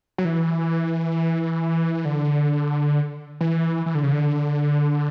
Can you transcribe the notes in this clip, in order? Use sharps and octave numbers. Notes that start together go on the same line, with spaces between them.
F#3
E3
D3
E3
E3
D3
C#3
D3